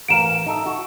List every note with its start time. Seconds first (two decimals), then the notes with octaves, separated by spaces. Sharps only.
0.08 A1 A#4 F5 D7 E7
0.47 D#4 A4 E5
0.66 F#4